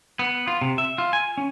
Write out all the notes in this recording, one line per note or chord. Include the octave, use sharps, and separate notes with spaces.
B3
F4
C3
E5
F4
G#5
C#4